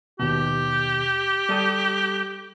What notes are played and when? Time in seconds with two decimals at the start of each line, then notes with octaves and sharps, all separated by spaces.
0.20 D#2 B2 G4
1.49 G3 A4 D#6